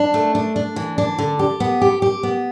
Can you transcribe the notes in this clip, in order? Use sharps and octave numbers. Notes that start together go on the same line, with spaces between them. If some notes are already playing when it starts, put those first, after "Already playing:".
Already playing: D4
A3
D4
D4
E3
D4
D3
G4
B3
G4
G4
B3